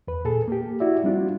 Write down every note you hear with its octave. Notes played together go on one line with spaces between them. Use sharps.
E2 B4
A#2 G#4 A4
A#3 G4
E4 F#4 D5 E5
G3 C4 D4 F4 F#4